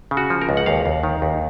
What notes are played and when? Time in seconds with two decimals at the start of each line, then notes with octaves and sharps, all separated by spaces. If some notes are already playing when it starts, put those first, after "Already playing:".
0.11 C#3
0.17 F#4
0.30 F3
0.42 A#4
0.49 C#2
0.57 F#5
0.66 D#2 F5
0.86 D#2
1.04 D#3
1.22 D#2